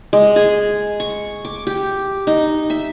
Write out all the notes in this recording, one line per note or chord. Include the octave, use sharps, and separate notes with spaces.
G#3
G#4
C#6
D6
G4
D#4
E5